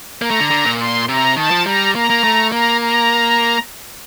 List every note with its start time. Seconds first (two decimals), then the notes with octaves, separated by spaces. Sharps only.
0.22 A#3 A#5
0.30 A3
0.40 D3
0.50 D3
0.65 A#2
0.79 C6
1.08 C3 A#5
1.36 D#3 A5
1.51 F3
1.65 G3 A#5
1.95 A#3 A#5
2.10 A#3
2.24 A3
2.52 A#3 A#5
2.81 A#5